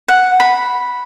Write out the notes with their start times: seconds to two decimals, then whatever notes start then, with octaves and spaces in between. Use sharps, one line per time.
0.08 F#5
0.40 B5